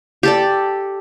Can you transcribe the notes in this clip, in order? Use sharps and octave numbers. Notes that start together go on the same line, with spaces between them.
G4 A4 D5